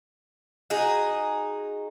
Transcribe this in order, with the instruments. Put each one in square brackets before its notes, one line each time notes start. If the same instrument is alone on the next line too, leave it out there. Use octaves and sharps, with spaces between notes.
[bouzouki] D#4 F#4 G#4